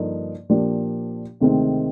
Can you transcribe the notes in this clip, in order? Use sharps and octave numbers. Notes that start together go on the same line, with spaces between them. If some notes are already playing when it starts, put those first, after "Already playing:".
Already playing: G2 D3 F3 A#3 D#4
A#2 F3 A#3 D4 G4
D2 C3 D#3 G#3 C4